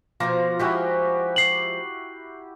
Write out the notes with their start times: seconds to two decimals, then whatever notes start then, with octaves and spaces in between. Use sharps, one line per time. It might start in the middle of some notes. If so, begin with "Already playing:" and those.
0.20 B2 F3 F4 A#5 D6
0.59 F3 G#3 C#4 E4 F#4 G4
1.36 C7 F#7